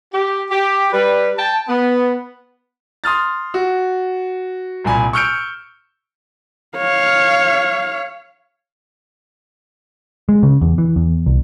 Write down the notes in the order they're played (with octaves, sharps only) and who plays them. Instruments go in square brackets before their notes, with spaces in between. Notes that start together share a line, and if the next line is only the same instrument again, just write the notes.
[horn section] G4
G4
G3 B4
G5 A5
B3
[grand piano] C6 D#6 F6 A6
F#4
C2 A#2 G#5 B5
C#6 E6 F6 G6 C#7 D7
[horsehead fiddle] C#5 F5
[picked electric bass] G#3
C#3
E2
E3
E2
C2